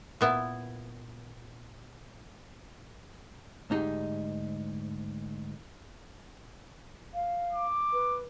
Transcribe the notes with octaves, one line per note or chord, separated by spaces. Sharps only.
A#2 B3 E4
D2 G#2 D#4 G4 G#4
F5
D6
B4